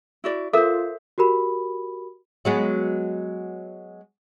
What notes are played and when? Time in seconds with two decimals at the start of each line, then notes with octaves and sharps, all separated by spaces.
0.24 E4 F#4 D5
0.53 F4 A4 A#4 C5 E5
1.18 F#4 G4 A#4 B5
2.45 F#3 G#3 B3